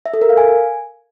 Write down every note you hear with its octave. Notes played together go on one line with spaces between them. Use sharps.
E5
A4
A#4
F5
G#5